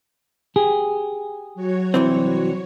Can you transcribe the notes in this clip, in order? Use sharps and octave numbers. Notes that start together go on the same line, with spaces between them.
G4 G#4
F#3 F#4 C#5
C2 E3 C4